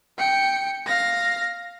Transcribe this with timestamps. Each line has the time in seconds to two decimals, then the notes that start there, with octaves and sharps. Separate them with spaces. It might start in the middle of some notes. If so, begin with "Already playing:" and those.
0.18 G5 C#7
0.86 F5 A#6